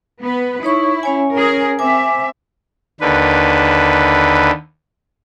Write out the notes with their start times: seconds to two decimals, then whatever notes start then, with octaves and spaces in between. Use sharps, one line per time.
0.22 B3 B4
0.63 D#4 E4 C#5 C#6
1.03 C#4 C#5 G#5
1.35 G#4 A#4
1.79 C4 E5 G#5 D6
3.01 D#2 D3 B4